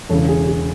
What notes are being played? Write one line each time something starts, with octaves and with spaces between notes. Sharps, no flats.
E1 E2 C#3 E3 A4 C#5
G#4
G#4